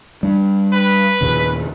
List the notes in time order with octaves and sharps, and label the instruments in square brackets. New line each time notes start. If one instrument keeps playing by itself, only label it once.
[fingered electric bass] G3 D4
[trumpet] B4
[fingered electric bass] D#2 A#2 C#3